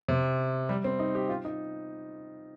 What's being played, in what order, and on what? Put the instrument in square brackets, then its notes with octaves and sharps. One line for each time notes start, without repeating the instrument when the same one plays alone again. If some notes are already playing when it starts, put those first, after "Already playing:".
[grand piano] C3
G3
C4
D#4
G4
F4
D#4